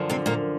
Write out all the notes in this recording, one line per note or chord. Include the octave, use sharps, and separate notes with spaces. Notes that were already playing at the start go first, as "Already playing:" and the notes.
Already playing: F#2 D3 F3
C3 C4
A#2 A#3